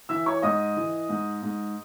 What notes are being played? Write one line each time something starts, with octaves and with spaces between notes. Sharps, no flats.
E3 E5 E6
C#5 C#6
G#2 D#5 D#6
E3
G#2
G#2